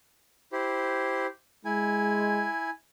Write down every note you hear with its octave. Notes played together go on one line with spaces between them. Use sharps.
E4 G4 C5
G#3 E4 G#5